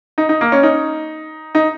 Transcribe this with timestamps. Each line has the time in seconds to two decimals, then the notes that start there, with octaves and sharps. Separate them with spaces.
0.18 D#4
0.29 D#4
0.41 A#3
0.52 C#4
0.63 D#4
1.55 D#4